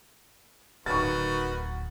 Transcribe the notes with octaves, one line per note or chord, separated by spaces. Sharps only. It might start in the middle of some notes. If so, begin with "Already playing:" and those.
D1 D2 D#3 F#4 B4 C#6 A6